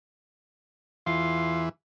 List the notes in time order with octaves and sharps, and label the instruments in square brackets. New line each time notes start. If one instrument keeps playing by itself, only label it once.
[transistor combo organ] E2 E3 [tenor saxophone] F4